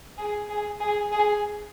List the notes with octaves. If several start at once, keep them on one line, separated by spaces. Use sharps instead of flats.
G#4
G#4
G#4
G#4